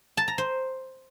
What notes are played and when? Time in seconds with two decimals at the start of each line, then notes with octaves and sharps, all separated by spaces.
0.17 A5
0.28 A#5
0.38 C5